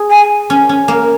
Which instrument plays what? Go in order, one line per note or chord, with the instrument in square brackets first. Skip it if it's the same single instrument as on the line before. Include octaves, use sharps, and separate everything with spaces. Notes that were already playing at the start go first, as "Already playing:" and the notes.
Already playing: [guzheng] G#4
[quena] G#5
[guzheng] C#4
C#4
A#3